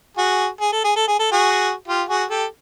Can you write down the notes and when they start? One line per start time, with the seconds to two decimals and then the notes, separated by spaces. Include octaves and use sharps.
0.17 F#4 G#4
0.61 G#4
0.72 A4
0.84 G#4
0.96 A4
1.08 G#4
1.19 A4
1.31 F#4 G#4
1.88 F4 G4
2.09 F#4 G#4
2.30 G4 A4